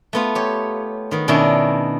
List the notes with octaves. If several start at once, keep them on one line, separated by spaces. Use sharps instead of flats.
A3 B3 F4
G4 C#5
D#3 B3
B2 D#3 C#4 D4 E4